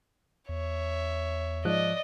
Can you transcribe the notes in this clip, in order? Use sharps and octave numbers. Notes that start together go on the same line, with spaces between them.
E2 C#5 E5
G#2 F3 D5 D#5 F#6